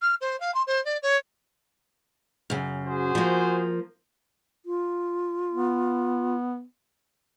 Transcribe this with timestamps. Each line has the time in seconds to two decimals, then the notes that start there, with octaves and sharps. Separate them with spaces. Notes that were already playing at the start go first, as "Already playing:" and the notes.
0.02 F6
0.21 C5
0.40 F5
0.54 C6
0.67 C5
0.85 D5
1.02 C#5
2.50 F#2 C#3
2.86 F#4 G#4 C5
3.15 F3 A#3
4.66 F4
5.52 B3